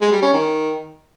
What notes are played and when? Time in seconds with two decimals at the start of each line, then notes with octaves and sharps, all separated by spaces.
0.01 G#3
0.12 G3
0.22 C#4
0.33 D#3